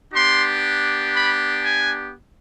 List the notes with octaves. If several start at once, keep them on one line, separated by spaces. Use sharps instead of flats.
B3 D4 G4 C6
B5
G#5